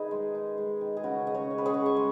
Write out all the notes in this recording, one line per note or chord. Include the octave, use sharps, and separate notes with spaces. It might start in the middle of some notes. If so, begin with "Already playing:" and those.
Already playing: D#3 D#4 G#4 B4
G#3
D#4
G#3
D#3
G#4
C#3 F#4 B4
C#3 D#5
G#4 C#5
C#4
B4
G#4 C#5
C#4
C#6
G#3